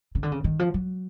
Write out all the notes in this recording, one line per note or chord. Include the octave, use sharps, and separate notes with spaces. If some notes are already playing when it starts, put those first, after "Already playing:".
C#3
D3
C#3
D#3
F3
F#3